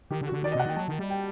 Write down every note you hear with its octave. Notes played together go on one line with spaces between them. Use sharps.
D#3 G4
D3
F#4
D3
D#3 D5
D#5
C3 F#5
D#3 G5
F#3 A5
D#3
G3
G5